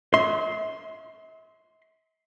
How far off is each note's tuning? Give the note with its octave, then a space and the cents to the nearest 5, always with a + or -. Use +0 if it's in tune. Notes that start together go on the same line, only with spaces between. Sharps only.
E5 -45 C6 +0